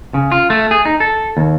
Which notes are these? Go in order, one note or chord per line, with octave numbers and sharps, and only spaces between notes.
C#3
F4
A3
G#4
D#4
A4
D#2